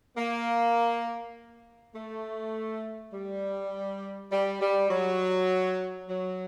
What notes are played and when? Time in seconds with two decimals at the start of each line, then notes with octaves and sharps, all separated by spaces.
0.17 A#3
1.94 A3
3.13 G3
4.31 G3
4.60 G3
4.90 F#3
6.09 F#3